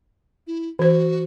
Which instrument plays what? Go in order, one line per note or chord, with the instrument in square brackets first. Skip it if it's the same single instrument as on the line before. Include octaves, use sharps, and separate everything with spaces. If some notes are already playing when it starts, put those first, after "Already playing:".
[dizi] E4
[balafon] E3 C5 [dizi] F#4